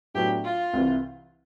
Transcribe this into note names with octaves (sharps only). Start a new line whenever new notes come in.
A2 F#3 B3 D4 G4
F4
C2 C3 E3